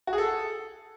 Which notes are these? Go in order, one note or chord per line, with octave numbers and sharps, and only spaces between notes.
F#4
G#4
A4